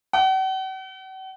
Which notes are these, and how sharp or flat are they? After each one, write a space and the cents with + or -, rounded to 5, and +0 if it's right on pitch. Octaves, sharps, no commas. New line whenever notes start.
F#5 +45